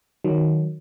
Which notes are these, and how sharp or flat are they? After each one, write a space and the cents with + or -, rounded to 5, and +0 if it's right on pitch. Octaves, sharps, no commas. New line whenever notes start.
D#3 +0 F#3 +0